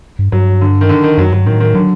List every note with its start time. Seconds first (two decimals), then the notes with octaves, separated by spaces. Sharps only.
0.19 G2
0.32 G2 F#3
0.61 D3
0.81 D#3
0.89 D3
1.04 D#3
1.17 F#2 F#3
1.32 G2 F#3
1.46 A2 D#3
1.60 D#3
1.75 D3 F#3